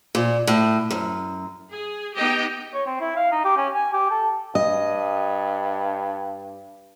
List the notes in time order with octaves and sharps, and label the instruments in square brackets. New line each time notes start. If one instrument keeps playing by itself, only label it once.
[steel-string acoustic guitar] A#2
A2
F#2
[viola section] G#4
B3 D#4 G4 D#5 G5
[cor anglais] C#5
C4
E4
F5
D#4
G4
C#4
G#5
G4
A4
[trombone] G2 [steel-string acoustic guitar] D#5